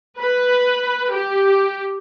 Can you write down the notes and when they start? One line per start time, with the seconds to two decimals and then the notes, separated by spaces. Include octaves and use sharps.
0.18 B4
1.12 G4